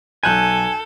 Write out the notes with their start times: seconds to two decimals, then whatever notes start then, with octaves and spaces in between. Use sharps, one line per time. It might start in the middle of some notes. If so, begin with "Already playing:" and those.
0.23 B1 A4 G#5 F#6 G6